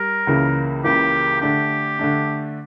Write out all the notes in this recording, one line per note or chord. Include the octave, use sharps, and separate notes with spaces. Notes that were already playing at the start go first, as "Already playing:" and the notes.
Already playing: G3 A#4
C#2 C#3 E3 A#3
C#2 C#3 E3 A#3 G4
D3 A3 D4 G4
D3 A3 D4